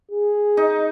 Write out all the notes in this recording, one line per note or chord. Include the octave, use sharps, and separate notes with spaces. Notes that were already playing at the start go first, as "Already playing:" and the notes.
G#4
D#4